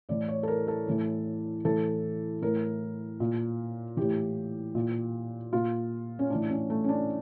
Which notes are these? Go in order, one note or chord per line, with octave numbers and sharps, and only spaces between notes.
A2 E3 D5
C#5
A4
A#4
A4
A2 E3
A2 E3 A4
A2 E3 A#4
A#2
A2 E3 G4
A#2
A#2 F4
C#4
A2 E3 D4
C#4
A3
C#4
D4